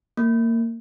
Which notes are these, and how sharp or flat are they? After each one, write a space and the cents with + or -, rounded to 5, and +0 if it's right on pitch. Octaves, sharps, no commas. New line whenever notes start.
A#3 -25